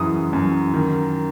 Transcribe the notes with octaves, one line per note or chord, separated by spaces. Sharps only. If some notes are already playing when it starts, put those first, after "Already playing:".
Already playing: F#2 C#3 E3 D#6
F#2
D#3